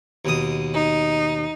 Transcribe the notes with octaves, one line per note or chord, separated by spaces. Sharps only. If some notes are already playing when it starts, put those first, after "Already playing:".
D#2 B2 D#6
D#4